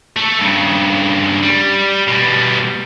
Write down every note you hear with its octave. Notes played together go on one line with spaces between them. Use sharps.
A3 A4
G2 C#3
G3
B2 G3